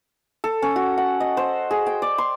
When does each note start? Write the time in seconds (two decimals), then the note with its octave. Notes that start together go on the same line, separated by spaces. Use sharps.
0.44 A4
0.62 C#4
0.76 F#4
0.98 F#5
1.20 D#5
1.37 C5
1.71 G#4
1.86 G5
2.02 D5
2.18 C6